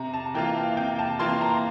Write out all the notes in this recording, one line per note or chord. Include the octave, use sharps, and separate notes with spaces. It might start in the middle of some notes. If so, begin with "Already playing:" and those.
Already playing: C3 A#5
A5
E3 A#3 F4 G5
F5
C3 G5
A5
E3 A#3 F4 C6
A#5